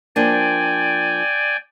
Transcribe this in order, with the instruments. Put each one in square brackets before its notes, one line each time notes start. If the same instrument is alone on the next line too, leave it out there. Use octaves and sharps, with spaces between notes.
[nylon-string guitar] F3 A#3 D4 [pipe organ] D5 G5 G#5